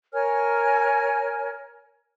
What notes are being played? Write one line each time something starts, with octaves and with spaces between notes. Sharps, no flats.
A#4 C#5 G#5 F6